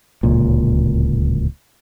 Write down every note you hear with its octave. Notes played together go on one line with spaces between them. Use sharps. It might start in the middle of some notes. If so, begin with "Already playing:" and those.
D1 C#2 A#2